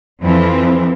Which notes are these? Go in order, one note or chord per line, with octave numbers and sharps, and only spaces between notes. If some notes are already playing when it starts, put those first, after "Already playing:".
F2 E3 F3 C4